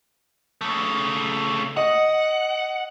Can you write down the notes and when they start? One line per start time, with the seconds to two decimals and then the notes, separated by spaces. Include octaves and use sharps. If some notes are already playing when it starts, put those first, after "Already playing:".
0.61 C#3 A3
1.77 D#5 F#5